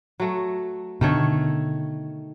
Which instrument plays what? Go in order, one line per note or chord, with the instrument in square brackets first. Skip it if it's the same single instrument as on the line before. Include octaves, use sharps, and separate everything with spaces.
[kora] F#3 A3
[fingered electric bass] B2 D3 [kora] D#3 A3 C#5